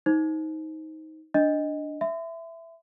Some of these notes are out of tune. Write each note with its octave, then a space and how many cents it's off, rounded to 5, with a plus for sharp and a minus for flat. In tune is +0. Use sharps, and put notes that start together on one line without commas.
D#4 +20 C5 +0
D4 +0 D#5 +0
E5 +10 C6 -45